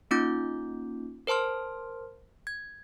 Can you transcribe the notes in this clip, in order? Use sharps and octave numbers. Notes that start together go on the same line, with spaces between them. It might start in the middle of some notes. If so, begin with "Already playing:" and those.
A#3 C#4 D#4 F4 D6 G6
A#4 C5 A5 C6 F6
G#6